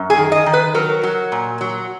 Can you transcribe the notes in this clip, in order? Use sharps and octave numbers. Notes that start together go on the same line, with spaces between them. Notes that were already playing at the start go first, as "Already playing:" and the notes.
Already playing: F#2
G#4
D#3
D#5
D#3
B4
F#3 A#4
F#3
A#2
F#3